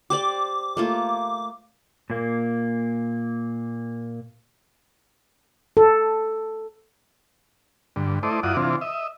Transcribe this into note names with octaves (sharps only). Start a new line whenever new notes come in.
G4 C5 D5 D6
A3 A#3 F4
A#2 A#3
A4
G2 D3
A3 E4 C5 D5 D#5
F#2 E4 F4 D5 F#5 D#6
C3 E3 C4 D4 F4
D#5 E5